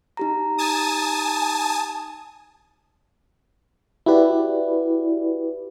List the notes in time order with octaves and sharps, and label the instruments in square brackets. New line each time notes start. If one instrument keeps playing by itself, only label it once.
[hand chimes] D#4 G4 A#5
[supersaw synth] G#5 A5 D#6
[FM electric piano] E4 F#4 G4 B4 D5